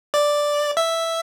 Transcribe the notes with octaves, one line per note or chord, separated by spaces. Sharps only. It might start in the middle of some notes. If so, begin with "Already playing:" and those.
D5
E5